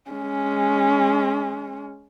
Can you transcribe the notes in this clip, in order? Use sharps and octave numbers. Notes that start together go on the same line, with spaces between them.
G#3 C#4